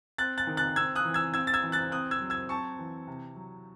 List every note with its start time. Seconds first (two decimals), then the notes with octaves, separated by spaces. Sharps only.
0.18 C4 F#6 A6
0.38 F#6 A6
0.47 D#3
0.57 F#6 A6
0.76 C4 E6 G#6
0.96 D#6 F#6
1.05 E3
1.14 E6 G#6
1.34 C4 E6 G#6
1.47 A6
1.54 E6 G#6
1.63 E3
1.72 F#6 A6
1.91 C4 D#6 F#6
2.11 E6 G#6
2.21 F#3
2.30 E6 G#6
2.49 C4 A5 C#6
2.79 E3
3.07 C3
3.36 F#3